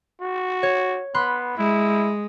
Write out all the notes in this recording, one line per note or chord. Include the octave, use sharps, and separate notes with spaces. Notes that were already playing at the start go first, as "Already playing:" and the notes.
F#4
C#5
B3 B5 C6 F#6
G#3 E4